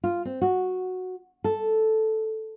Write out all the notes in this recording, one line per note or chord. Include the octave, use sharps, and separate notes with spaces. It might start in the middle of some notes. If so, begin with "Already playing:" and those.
F4
C4
F#4
A4